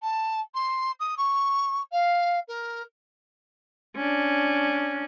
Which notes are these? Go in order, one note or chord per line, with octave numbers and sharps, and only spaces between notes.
A5
C6
D#6
C#6
F5
A#4
C#4 D4